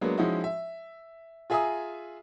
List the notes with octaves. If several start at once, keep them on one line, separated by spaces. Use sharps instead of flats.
F#3 G#3 A#3 B3 D4
F3 G#3 C#4 D#4 E4 F#4
E5
F4 G#4 E5 G#5 A#5 D#6